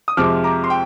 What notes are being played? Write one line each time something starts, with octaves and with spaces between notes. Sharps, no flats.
D#6
F2 C3 F3 G#3 D6 F6
A#5 D6
C6
G5